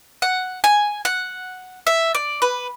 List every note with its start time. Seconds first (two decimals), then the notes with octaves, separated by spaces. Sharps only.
0.22 F#5
0.64 G#5
1.05 F#5
1.87 E5
2.15 D5
2.42 B4